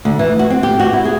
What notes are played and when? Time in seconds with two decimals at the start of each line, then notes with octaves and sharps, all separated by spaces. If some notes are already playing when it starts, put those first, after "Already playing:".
0.05 D2
0.19 E3
0.39 F#4
0.50 C4
0.63 G4
0.80 F#4
0.93 E4
1.05 G#4